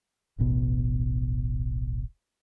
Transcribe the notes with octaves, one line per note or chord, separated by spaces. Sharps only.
D1 A1 B2